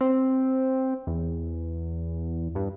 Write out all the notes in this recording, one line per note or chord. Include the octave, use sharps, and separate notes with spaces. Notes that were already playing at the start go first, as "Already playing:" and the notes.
C4
E2
G2